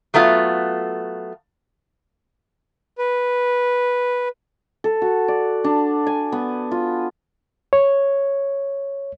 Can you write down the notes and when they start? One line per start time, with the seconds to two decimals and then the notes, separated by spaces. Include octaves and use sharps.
0.14 F#3 A3 B3 F4
2.98 B4
4.84 A4
5.02 F#4
5.28 D5
5.64 D4
6.07 G#5
6.32 B3
6.71 F4
7.73 C#5